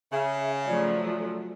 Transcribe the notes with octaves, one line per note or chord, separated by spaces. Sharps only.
C#3 E5
F3 F#3 A3 D5